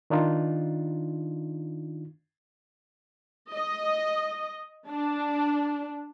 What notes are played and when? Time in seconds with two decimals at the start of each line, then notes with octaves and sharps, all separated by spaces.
0.10 D#3 D4 D#4 F4
3.53 D#5
4.88 D4